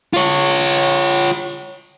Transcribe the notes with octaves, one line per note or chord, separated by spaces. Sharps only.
F4 C#5